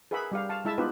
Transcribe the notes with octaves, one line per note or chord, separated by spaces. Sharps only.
G#4 A#4 B4 E5 F#5 B5
G3 G4 F5
F5 A5
G#3 E4 E5 A5
B3 D#4 F4 G4 B4